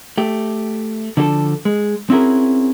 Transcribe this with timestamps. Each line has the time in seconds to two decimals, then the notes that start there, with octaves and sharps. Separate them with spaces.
0.18 A3 G4
1.17 D3 F3 D4 F#4 A4
1.65 G#3
2.10 C4 C#4 E4 F#4 G#4 A#4